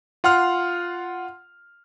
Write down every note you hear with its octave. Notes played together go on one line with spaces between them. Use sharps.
F4 F#5 C6 F6